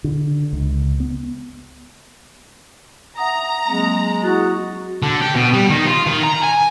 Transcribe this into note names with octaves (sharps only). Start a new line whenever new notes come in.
D3
C#2
B3
E5 F#5 A#5 D#6
F#3 G#3 A#3 C4
E4 F#4 F#6 A6
D3
G4
B2
G3
D#3
F4
D#3
A#5
G#5